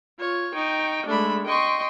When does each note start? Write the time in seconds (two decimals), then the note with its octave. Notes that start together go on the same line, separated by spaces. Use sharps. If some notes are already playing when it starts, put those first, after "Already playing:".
0.19 F4 C#5
0.54 D#4 G5 C#6
1.07 G#3 A3 D4 B5
1.47 D#5 G5 C6 C#6